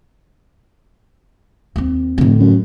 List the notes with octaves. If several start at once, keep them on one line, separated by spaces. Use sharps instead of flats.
D#2 C4
F1 A2 D3
F#2